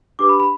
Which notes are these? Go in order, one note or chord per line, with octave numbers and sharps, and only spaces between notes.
D4 G4 B4 D6
B5
B5